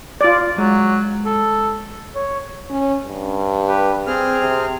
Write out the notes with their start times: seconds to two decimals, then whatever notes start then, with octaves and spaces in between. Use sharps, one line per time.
0.21 F4 D5
0.58 F#3 G#3
1.25 A4
2.15 C#5
2.70 C#4
3.07 G2
3.68 G4 B4
4.07 C4 G#4 F6
4.38 C3